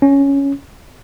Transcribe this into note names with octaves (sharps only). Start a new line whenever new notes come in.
C#4